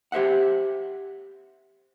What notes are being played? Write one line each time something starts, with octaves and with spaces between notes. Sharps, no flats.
G4 C5 E5 F#5